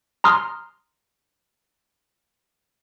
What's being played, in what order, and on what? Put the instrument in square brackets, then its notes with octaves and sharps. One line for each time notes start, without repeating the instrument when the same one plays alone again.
[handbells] A#5 C6 D#6 F6